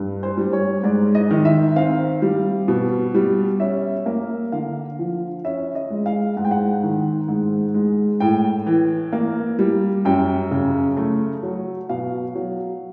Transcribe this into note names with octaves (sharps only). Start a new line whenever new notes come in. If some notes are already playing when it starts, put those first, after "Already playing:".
Already playing: G2
C5
G3
C#5
G#2 D5
D#5
D#3
E5
C4 F5
G3
B2
G3
C#4 E5
A#3
D3 F5
F3
C#4 E5
D#5
G#3
F5
G#2 F#5
G5
F#5
D#3
G#2
G#3
A2 G5
E3
A#3
G3
F#2 G5
C#3
A3
F#3
B2 F5
F#3